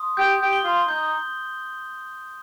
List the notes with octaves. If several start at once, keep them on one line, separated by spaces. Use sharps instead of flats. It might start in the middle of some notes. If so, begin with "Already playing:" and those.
Already playing: C6 D#6
G4 G6
G4
G7
F4
D#4 G6